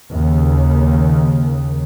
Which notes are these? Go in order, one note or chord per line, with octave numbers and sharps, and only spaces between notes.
D#2 C#3